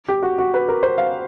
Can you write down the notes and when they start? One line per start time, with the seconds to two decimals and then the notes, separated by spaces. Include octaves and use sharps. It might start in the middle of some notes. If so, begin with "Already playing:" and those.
0.08 G4
0.23 F#4
0.38 F#4
0.54 B4
0.68 A#4
0.83 C5
0.98 F5